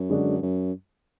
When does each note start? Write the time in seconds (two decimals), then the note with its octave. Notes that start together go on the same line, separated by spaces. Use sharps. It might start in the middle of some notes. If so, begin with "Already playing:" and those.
Already playing: F#2
0.10 D3 G#3 D4 F#4
0.42 F#2